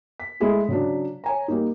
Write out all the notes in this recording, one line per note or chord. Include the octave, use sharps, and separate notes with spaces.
B6
G#3 A3 E4 G#4 A4
C#3 F#3 D4
C#5 G#5 A#5
G3 A#3 D#4